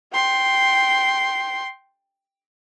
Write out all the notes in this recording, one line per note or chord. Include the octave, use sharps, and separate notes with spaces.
G5 C6